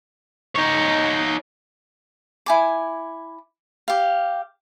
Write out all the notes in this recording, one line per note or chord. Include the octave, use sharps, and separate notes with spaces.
D#4 C#5
E4 G#5 D6
G4 F5